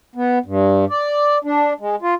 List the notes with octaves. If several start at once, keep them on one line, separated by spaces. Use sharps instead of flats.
B3
G2
D5
D4
G#3
F4